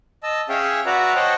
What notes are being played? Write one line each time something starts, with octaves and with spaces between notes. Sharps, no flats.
D#5 A5 E6
C#4 G#4 C#5 E5 F5 G5
F#4 B4 D5 E5 F#5 A#5
C5 C#5 D#5 F#5 G5 A5